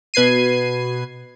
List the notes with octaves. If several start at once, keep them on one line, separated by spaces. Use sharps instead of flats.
B2 B4 G#6 C7 D#7